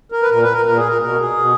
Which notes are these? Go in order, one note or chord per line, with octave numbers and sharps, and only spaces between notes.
A#4
B4
A#2 A#4
B4
A#4
A#2 A#4
G#4
A#4
B2 A#4
G#4
B2